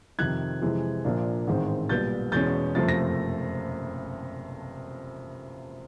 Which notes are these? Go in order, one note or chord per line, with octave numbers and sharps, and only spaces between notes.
F2 C3 D#3 F#6 G#6
F2 C3 E3 G#3
A#1 A#2 F3 A#3 D4
A1 G#2 D#3 G#3 C4
B1 A#2 G3 B3 G6 A6
E2 B2 G#3 C#4 G6 A6
F#1 F2 C3 F3 A3 A6
A#6